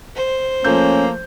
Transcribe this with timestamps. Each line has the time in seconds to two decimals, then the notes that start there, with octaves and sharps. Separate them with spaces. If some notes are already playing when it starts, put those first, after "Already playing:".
0.16 C5
0.64 F3 A3 A#3 C#4 G6